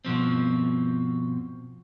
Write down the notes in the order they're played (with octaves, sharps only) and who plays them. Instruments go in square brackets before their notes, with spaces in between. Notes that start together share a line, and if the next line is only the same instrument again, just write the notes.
[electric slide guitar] G2 B2 F3 C4